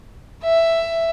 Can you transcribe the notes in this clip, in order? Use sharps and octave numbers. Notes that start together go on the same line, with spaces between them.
E5